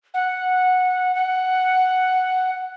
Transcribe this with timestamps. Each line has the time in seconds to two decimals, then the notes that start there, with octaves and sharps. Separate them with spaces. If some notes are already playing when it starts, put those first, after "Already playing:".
0.14 F#5
1.15 F#5